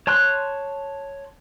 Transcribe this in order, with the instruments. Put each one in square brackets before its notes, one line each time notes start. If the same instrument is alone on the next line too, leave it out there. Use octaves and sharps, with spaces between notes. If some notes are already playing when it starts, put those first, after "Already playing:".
[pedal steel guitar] C#5 A5 C6 F#6